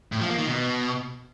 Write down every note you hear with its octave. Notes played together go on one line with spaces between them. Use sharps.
A2
F3
A#3
D#3
B2